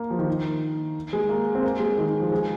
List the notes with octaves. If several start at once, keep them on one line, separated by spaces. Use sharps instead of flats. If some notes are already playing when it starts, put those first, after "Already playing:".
Already playing: A#3
F3
D#3
G#3
A#3
C4
A#3
G#3
D#3
F3
G#3